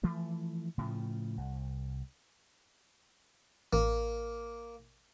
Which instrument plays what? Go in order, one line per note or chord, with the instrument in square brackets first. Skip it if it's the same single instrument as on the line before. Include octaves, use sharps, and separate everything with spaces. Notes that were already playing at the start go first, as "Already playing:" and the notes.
[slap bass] E3 F3 A3
A2 C#3 F3
C2
[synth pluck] A1 [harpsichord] A#3